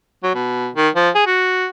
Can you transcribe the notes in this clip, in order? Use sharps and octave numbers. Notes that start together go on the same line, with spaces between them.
F#3
B2
D#3
F3
G#4
F#4